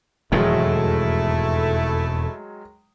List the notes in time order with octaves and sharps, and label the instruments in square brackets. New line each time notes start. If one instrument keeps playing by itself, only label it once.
[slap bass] E1 F2 G#2 [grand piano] D#3 F#3 G#3 [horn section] A3 E4